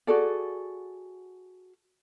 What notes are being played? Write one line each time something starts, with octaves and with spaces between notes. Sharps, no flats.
F#4 G#4 A4 D5